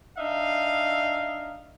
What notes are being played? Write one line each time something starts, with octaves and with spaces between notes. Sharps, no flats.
D4 D#4 E5 F5